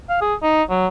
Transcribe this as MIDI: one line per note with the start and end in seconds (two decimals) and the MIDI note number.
0.09 0.21 77
0.21 0.34 68
0.43 0.63 63
0.70 0.87 54